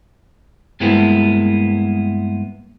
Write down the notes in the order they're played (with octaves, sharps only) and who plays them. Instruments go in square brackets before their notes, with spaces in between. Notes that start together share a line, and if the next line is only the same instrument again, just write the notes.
[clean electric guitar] G2 G#3 A#3 B3 E4 B4